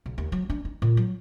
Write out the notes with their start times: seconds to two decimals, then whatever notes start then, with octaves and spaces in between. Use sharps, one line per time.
0.06 B1
0.18 D#2
0.32 F#3
0.50 D4
0.65 D#4
0.82 A#2
0.97 F#3